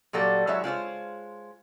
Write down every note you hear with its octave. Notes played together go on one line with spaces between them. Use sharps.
A#2 F#3 G3 A4 D5
F#3 G#3 E4 C#5 E5
G#3 F4 C5 C#5